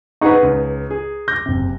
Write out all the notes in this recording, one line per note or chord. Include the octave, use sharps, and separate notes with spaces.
D#4 G#4 B4 F#5 C#6
C#2
G#4
D6 G6 A#6
F#1 C3